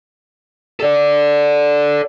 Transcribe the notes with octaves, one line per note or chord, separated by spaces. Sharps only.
A4 D5